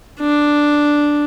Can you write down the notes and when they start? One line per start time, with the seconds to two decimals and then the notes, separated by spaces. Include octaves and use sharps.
0.20 D4